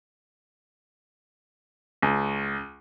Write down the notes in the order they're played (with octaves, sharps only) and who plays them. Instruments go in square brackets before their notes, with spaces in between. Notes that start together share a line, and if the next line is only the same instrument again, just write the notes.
[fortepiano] C#2